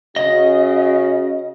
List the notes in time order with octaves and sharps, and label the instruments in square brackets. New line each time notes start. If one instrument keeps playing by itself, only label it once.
[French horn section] C#3 F#4 [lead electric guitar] D#5